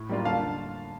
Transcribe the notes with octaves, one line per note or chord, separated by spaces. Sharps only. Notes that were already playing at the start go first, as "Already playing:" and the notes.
Already playing: A2
G3 A#3 D4 F4
D3 F5 A5